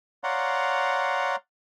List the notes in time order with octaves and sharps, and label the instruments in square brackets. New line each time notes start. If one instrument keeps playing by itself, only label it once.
[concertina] C#5 D5 F5 F#5 A#5 C6